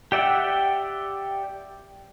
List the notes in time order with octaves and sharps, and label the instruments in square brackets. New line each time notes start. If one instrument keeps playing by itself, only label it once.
[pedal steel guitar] G4 D5 E5 F#5 G5